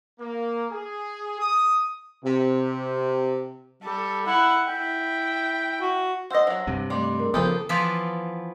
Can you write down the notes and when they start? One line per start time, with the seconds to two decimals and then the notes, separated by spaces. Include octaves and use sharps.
0.19 A#3
0.70 G#4
1.39 D#6
2.24 C3
3.83 G3 A4
4.26 E4 F#5
4.68 E4 G5
5.81 F#4
6.30 C5 D#5 F#5 E6 A#6
6.47 F3 F#3 C5
6.67 G2 C3
6.90 G3 A3 C6 D6
7.20 G#4 A#4
7.34 C#3 F3 B3 G4 A4 C5 D#6 G6
7.69 E3 F3 B3 E4 F4 D5